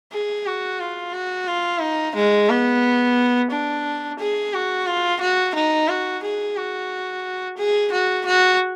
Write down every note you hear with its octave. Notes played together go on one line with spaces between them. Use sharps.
G#4
F#4
F4
F#4
F4
D#4
G#3
B3
D4
G#4
F#4
F4
F#4
D#4
F#4
G#4
F#4
G#4
F#4
F#4